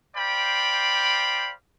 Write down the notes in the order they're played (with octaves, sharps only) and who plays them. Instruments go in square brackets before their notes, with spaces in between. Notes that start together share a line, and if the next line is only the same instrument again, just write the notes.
[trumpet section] C5 D5 F5 G5 B5